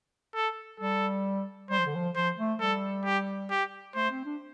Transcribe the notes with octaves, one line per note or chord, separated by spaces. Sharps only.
A4
G3 A4
G3 C5
F3
D3
F3
F3 C5
A3
G3 A4
G4
G4
A3 C5
C4
D4